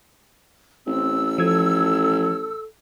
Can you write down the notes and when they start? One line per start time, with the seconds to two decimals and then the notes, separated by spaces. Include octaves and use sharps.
0.87 A1 C4 E6
1.38 F3 A4 G#6